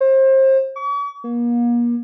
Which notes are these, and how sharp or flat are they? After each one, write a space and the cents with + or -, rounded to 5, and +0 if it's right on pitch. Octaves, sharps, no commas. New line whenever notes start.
C5 +30
C#6 +45
A#3 +40